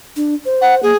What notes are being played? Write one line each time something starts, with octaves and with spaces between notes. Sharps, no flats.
D4
C5
F#5
A#3 G#4